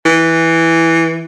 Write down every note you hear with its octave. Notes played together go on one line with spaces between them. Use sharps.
E3